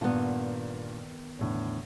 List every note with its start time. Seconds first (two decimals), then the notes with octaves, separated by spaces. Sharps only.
0.01 G2 A#2 D#3 B3
1.39 E2 A2 D3